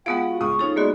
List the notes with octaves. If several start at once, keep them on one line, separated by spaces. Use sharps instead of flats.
G#3 B3 F4 G#4 F#5 G5 D#6 D7
F#4
C#2 C#6 D#6
C#4 D#4 F4 A4
G#3 A#3 B3 F#4 D5